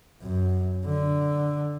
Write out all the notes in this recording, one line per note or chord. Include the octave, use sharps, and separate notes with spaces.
F#2
D3